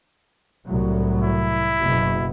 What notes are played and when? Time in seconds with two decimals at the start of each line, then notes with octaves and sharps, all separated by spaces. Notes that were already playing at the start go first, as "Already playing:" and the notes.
0.65 C2 A2 F#3
1.22 E4
1.80 F#1 B2